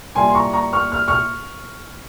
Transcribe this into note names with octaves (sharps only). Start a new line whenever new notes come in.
A#2 G3 A#3 E4 G#5 C6
C6
A#5 C#6
A#5 C#6
C#6 F6
F6
C#6 F6